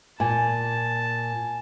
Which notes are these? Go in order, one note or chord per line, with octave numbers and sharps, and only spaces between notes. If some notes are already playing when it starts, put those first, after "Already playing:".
A#2 G#5 A5